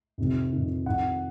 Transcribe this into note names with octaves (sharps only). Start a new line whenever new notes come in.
F2 C3 D#3
F2 C3 D#3
F2 D#3 F#5